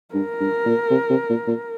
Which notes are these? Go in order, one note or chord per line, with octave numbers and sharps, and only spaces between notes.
G2 A#4
G2
A#2
C3
C3
A#2
A#2